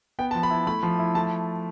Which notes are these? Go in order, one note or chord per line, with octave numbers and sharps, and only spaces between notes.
B3 G5
A5
F3
B5
E4
A3 B5
F3
E4
A3 A5